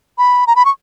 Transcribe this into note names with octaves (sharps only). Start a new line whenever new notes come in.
B5
A#5
B5
C#6